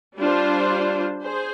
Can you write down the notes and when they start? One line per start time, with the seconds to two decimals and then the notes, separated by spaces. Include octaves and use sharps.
0.18 G3 D4 F4 C5
1.23 G#4 C5